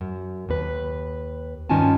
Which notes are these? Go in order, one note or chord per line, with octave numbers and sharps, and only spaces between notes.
F#2
D#2 B4
G2 D#3 C#4 F4 G#5 A5